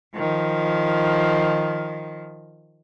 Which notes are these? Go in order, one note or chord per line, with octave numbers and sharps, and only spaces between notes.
D#3 F3